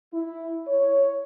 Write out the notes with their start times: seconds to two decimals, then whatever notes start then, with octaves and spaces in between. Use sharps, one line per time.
0.13 E4
0.68 C#5